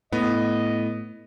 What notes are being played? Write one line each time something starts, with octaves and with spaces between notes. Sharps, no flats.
A2 B3 D#5